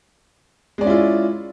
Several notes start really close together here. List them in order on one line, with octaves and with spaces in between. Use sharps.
G#3 D5 C#4 E4 F4